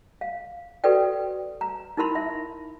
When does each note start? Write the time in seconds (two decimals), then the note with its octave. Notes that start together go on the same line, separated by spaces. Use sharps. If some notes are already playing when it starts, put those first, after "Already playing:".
0.21 F5
0.84 F#4 A4 B4 D5 G5
1.61 A#5
1.97 D#4 E4 A#4 B5 C6
2.15 E5